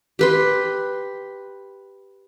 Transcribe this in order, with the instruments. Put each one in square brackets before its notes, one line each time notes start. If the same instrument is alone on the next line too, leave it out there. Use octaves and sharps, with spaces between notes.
[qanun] G4 B4 C6